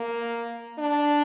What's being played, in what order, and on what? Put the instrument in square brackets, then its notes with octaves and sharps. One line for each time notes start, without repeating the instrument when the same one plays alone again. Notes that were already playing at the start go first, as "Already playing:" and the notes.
Already playing: [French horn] A#3
D4